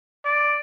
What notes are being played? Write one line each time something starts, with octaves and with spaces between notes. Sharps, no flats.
D5